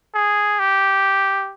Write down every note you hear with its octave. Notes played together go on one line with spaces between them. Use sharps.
G#4
G4